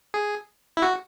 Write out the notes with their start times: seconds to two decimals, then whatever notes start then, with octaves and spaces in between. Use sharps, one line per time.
0.14 G#4
0.77 E4
0.82 F#4